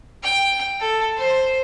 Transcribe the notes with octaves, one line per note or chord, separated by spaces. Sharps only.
G5
A4
C5